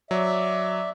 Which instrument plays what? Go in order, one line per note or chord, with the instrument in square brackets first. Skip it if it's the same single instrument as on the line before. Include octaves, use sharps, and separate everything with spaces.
[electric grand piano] F#3 [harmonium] D5 E5